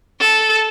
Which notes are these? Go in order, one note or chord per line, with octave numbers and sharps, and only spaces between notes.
A4